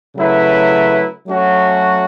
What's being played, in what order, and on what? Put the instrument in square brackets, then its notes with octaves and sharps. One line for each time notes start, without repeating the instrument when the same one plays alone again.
[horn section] C#3 F#3 A3 E4 B4
F#3 A3 C#4 F#4